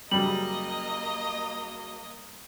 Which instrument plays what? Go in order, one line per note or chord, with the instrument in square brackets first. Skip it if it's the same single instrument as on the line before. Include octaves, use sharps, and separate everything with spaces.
[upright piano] F#2 C#3 [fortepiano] G3 [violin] A#3 D#5 [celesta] F#7